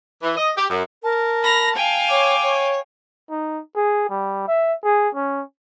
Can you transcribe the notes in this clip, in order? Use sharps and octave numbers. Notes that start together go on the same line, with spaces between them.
E3
D#5
G4
F#2
A#4 A5
B5 F6 A#6
F5 G5 G#5
C#5 D6
C#5
D#4
G#4
G3
E5
G#4
C#4